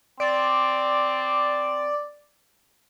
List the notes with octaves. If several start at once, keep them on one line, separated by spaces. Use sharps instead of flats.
C4 D5